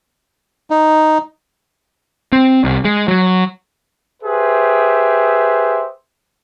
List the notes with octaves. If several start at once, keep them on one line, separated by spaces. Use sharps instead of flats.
D#4
C4
C2
G#3
F#3
G4 G#4 B4 C5 E5